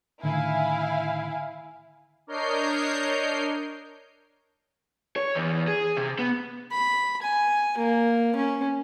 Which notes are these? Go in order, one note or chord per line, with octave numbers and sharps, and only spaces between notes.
A2 D3 D#3 E4 F5 G#5
D4 A#4 C#5 D#5 G6 C7
C#5
E2
G#4
C3
B3
B5
G#5
A#3
C#4